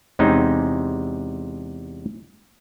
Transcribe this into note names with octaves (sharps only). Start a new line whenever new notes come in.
E2 C3 G#3 C4 C#4 D#4